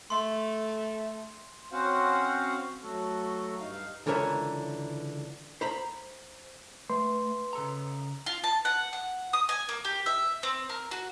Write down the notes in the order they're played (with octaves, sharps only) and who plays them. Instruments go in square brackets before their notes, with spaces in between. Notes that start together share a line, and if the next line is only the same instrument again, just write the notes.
[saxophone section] A3 [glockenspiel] C6
[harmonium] C4 C#4 F#4 C5 F5 F#5
F#3 A3 F#4 A4
G2 D#4 F5
[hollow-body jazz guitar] C#2 D3 E3 A#4 C#5 E5
C5 A#5 B5
[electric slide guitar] A3 [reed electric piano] B4 C6
[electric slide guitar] C#3 A4 A#5
[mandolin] F4
A5
F#5
F#5
D#6
G#5
A#3
G4
E5
C4
A#4
F#4